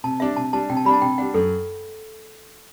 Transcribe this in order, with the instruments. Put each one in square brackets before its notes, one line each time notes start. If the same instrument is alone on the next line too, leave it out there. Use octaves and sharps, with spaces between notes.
[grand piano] C3 [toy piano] A5
[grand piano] G3 D4 [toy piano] E5
[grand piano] C3 [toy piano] A5
[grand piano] G3 D4 [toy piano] A5
[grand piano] C3 [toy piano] G5
[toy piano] A5
[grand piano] G3 D4 [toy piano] B5
[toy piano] A5
[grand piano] C3 [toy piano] G5
[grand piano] G3 D4 [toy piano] F#5
[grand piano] F#2 [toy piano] A4